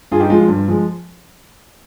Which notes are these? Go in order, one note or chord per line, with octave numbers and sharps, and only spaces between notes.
G2 F4 G#4
D#4 G4
F3 G#3 F4
F4
G2
F3 G#3